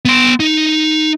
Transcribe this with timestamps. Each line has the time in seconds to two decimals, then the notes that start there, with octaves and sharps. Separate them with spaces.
0.05 B3 C6
0.40 D#4